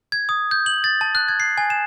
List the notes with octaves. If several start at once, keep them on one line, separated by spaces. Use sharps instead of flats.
G#6
D#6
G6
F#7
A6
A5
F#6
G#6
C7
G#5
E7